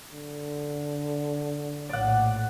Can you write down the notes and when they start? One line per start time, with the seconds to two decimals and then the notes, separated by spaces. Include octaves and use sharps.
0.11 D3
1.89 A#1 A2 D5 F#5